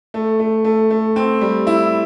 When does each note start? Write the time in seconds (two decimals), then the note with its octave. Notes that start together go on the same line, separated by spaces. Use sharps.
0.14 A3
0.39 A3
0.65 A3
0.91 A3
1.16 C4
1.41 G3
1.67 E4